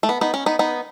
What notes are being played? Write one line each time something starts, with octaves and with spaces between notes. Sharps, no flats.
A3
B3
B3 D#4
C#4
B3 D#4
B3 D#4